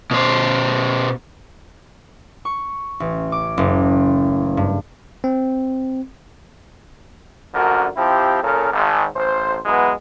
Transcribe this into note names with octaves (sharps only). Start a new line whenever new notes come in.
B2 C5
C#6
A1
D6
F#1
G2
C4
A#1 F#2 D3 F#4 A#4
F3 C4 E4 G4
A#2 C#3 C#4 A4 A#4
G#1
A1 C5
E3 F#3 G#3 B3